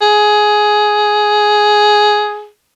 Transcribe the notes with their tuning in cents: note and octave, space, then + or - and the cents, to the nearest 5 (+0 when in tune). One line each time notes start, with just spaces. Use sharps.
G#4 +10